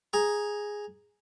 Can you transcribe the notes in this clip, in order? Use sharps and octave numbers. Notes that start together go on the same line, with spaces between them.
G#4 A#5